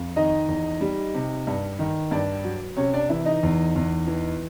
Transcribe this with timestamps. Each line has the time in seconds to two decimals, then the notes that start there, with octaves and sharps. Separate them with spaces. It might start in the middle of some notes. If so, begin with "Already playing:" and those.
Already playing: F2
0.16 D#3 D#4 D#5
0.48 E2
0.81 G3
1.14 C3
1.47 G2
1.79 D#3
2.11 G2 D4 D5
2.44 F#3
2.76 C3 C#4 C#5
2.94 D4 D5
3.09 E3 E4 E5
3.25 D#4 D#5
3.43 E2
3.76 E2
4.07 E3